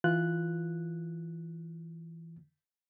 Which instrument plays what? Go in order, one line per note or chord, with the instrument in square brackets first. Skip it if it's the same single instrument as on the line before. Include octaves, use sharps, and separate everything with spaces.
[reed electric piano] E3 F4 F#6